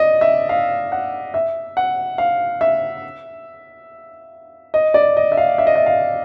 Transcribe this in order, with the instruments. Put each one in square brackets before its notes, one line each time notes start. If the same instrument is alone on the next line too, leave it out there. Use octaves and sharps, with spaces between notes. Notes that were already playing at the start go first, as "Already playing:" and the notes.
Already playing: [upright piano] D5 D#5
E5
F5
F#5
E5
F#5
F5
E5
D#5
D5
D#5
E5
F5
E5
D#5
E5
F5